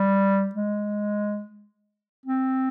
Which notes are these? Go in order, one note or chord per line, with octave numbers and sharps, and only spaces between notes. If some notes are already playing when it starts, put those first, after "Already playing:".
Already playing: G3
G#3
C4